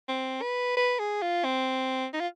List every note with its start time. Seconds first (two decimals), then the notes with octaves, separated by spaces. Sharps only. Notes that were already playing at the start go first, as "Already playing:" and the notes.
0.08 C4
0.42 B4
0.77 B4
0.99 G#4
1.22 F4
1.44 C4
2.13 D#4
2.20 F4